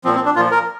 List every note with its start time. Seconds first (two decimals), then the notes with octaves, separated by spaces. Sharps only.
0.05 A#2 F3 C4
0.15 C4
0.25 D4
0.36 A#2 F4
0.39 F3
0.51 A#4